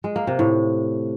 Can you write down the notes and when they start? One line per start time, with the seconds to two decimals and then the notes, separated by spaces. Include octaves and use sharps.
0.04 G#3
0.16 A#3
0.27 C3
0.39 A2